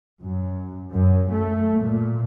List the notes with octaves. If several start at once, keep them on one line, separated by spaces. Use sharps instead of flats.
F#2
F#2
A3
A#2